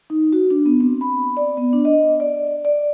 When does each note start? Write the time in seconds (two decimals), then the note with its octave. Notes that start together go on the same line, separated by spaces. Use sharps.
0.10 D#4
0.32 F#4
0.51 D4
0.65 B3
0.80 C4
1.01 B5
1.37 D5
1.57 B3
1.73 D4
1.85 D#5
2.20 D5
2.65 D5